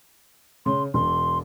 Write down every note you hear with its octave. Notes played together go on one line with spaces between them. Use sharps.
C#3 C6
E1 C6